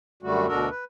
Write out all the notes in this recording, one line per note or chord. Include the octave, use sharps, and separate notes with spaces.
F#2 D3 G3 A3 F#4
D2 B2 D4 F#4 A4 A#4
B4